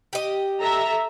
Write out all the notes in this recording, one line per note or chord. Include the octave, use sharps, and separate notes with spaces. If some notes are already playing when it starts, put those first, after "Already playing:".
G4 D#5
A4 E5 A#5